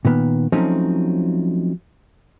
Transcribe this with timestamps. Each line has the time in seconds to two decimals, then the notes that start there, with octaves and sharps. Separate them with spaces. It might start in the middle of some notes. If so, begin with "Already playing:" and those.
0.05 A#2 D#3 B3
0.52 F3 F#3 A3 C4 C#4 D#4